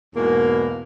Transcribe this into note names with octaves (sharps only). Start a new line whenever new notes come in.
E2 G#2 B2 A#3